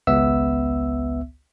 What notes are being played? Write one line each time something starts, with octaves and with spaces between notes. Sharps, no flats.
G#1 C#2 B3 E5 E6